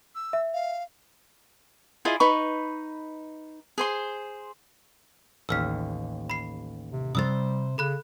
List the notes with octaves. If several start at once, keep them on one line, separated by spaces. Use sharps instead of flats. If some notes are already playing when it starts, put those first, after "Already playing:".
E6
E5
F5
E4 F4 G#4 D#5
D#4 B4 B5 C#6
G#4 C5 C6
A1 D#2 E6 F6 B6
B5 C7
C3
C3 G3 C5 D#6 E6 A6
C#3 A4 B5 F#6